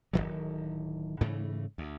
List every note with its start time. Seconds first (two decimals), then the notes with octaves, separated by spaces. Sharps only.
0.13 D1 E2 D#3 F#3
1.21 G#2 C#3 E3 A3
1.78 D2